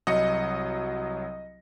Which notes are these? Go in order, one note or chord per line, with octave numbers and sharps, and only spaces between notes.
C2 F#3 D#5 C#7